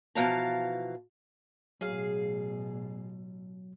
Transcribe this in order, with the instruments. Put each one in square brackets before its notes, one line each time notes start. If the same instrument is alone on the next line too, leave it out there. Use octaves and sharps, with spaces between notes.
[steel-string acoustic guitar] B2 E3 F3 F5 A5 A#5
[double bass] A1 B2 [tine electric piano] F#3 [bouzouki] G#4 F5